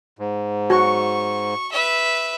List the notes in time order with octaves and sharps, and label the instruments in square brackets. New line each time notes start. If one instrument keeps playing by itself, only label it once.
[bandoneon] G#2
[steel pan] F#4 [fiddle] C#6
[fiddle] B4 E5